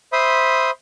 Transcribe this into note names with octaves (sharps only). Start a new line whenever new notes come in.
C5 E5 B5 C6 D#6